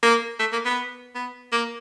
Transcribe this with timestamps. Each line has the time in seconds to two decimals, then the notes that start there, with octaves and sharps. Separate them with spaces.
0.03 A#3
0.40 A3
0.52 A#3
0.65 B3
1.15 B3
1.52 A#3